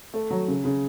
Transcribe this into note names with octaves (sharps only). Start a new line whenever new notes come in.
A3
F#3
C#3
C#3